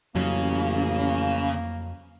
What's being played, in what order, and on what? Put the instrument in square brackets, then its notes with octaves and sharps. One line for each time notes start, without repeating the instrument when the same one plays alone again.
[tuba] A1 [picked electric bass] F2 F#3 [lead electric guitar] C#3 [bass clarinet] A#3